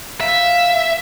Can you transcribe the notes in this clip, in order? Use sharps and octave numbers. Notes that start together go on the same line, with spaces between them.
E5 F5